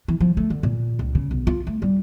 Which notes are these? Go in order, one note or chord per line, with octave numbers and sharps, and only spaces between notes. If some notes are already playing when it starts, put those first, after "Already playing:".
E3
F3
A3
D3
A#2
C#2
C#3
B1
F4
A3
G3